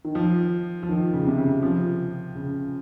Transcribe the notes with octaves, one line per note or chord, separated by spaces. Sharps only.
D#3
F3
F3
D#3
C#3
C3
C#3
F3
C#3